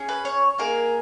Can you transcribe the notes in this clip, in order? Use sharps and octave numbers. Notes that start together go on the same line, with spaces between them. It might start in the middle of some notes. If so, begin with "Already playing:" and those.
Already playing: C#4 G#4
B4
C#5
A#3 D#4 G#4 A#4